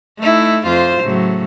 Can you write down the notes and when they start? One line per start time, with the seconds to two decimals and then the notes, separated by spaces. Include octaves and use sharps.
0.19 A3 D#4 E4
0.67 F2 F4 C5
1.02 A2 C#3 F#3